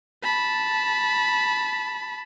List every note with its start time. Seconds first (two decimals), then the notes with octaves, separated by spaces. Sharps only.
0.23 A5 B5